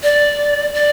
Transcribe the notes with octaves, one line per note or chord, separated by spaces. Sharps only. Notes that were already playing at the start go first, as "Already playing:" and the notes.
D5
D5